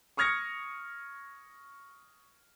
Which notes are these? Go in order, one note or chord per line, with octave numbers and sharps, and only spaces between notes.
C#6 D#6 F6 G#6 A#6 C#7